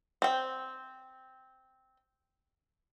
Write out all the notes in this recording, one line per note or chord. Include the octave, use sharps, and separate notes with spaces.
C4 G5